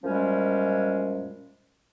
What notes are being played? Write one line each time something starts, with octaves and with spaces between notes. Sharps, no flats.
F#2 A#2 F3 G3 G#3 C#4